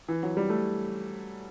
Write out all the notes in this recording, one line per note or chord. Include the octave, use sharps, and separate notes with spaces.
E3
F#3
G3
A3